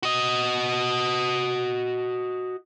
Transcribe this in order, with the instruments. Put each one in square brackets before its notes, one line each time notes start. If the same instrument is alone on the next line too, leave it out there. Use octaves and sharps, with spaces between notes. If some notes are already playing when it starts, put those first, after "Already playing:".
[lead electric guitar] F#4 D#5